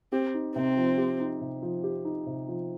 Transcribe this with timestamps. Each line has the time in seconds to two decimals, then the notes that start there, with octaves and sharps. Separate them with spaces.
0.12 C4 G4
0.34 D#4
0.56 C3 C4
0.77 F3
0.98 G4
1.20 D#4
1.41 C3
1.63 F3
1.84 G4
2.05 D#4
2.27 C3
2.48 F3